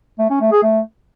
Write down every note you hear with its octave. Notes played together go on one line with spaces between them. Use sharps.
A3
C#4
A3
G#4
A3